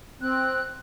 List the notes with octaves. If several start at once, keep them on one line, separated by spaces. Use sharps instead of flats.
C4 F#6